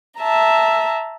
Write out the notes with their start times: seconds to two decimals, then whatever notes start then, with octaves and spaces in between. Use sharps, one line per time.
0.20 E5 A5 A#5